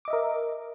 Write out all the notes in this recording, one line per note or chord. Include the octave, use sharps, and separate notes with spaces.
A#4 D#5 E5 D6